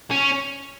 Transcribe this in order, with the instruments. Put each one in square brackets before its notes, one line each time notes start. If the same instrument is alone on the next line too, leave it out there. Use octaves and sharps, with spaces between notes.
[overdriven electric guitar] C#4